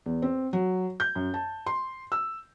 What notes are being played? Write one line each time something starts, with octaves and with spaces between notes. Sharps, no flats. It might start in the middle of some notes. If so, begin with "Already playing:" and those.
E2
C4
F#3
G6
F#2
A5
C6
E6